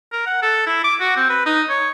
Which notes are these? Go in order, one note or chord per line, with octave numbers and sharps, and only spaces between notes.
A#4
F#5
A4
E4
D6
F#4
C4
B4
D#4
C#5